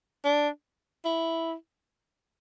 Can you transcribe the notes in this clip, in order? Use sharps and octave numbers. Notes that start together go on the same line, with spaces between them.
D4
E4